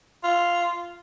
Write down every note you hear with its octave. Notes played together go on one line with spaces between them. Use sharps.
F4